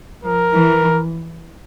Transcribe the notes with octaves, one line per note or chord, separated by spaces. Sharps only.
F3 A#4
E3